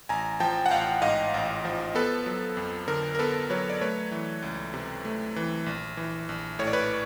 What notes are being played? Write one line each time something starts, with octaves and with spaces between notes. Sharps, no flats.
A1 G#5 A#5
F3 G5 A5
F#5
A1 F5 G5
G#2 D#5 F5
A1
F3
B3 A4 B4
F#3
F2
D3 A#4
A#4
B3 A4 B4
F#3 B4 C#5
D5
A3 B4 C#5
E3
C#2
C3
A3
E3
A#1
E3
A#1
A2 C#5
D5
B4 C#5